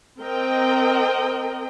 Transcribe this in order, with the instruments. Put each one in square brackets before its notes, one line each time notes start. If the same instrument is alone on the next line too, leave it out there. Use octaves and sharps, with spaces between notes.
[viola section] C4 A#4 D#5 G5